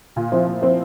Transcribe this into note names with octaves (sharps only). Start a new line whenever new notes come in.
A#2
F3 C4 E4
A#2
F3 C4 E4